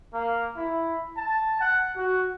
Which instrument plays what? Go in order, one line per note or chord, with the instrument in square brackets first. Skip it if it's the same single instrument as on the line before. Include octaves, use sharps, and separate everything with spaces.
[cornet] A#3
E4
A5
F#5
F#4